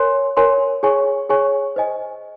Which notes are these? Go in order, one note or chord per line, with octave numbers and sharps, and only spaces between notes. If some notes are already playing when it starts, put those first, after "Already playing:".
Already playing: A#4 C#5 G#5 C6
A#4 C#5 G#5 C6
G#4 C#5 G#5 C#6
G#4 C#5 G#5 C#6
C5 D#5 G#5